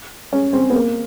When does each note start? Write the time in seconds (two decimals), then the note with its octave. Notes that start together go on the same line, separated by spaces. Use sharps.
0.33 C#4
0.53 C4
0.70 B3
0.74 A#3